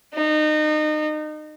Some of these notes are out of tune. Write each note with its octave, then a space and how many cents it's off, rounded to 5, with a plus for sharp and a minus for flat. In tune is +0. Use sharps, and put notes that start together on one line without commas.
D#4 -30